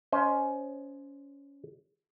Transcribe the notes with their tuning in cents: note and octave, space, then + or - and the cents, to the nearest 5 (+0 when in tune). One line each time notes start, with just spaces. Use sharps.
C#4 +20 C5 +0 D#5 -10